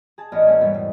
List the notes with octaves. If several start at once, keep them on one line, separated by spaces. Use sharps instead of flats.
G#4 A5
A1 B3 C#4 D5 D#5 F6
A3 A#3 C#4 G#4 C#5
E2 G#2 E3 G3 A3 B3
B2